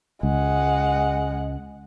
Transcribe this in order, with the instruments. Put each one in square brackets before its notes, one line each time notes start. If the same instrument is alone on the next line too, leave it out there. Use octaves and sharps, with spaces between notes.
[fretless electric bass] C#2 [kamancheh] G#3 F#5